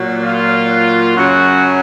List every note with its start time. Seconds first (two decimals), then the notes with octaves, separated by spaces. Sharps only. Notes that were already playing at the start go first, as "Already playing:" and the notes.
Already playing: A#2 F#3
0.22 F4
1.17 F#2 C#3 F#3 F#4